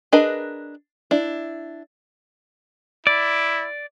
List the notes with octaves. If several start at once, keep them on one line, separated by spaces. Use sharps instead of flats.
D4 G#4 A#4 B4 D#5
D4 E4
E4 D5